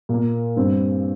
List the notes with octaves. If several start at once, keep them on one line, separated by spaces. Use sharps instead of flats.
A#2 A#3
G2 G3 C4